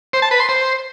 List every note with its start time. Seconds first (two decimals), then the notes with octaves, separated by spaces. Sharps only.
0.13 C5
0.22 A5
0.31 B4
0.40 C6
0.49 C5